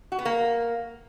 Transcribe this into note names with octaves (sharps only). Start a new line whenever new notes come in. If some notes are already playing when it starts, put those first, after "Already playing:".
F#4
B3
A#3